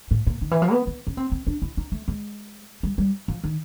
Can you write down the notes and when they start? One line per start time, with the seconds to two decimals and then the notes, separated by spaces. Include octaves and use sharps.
0.11 A2
0.27 A#2
0.41 D#3
0.51 E3
0.62 F3
0.72 B3
0.87 B3
1.07 C#4
1.17 C4
1.32 C4
1.47 D4
1.62 E4
1.77 D#4
1.92 A3
2.08 G#3
2.83 G3
2.98 G3
3.28 F3
3.44 D#3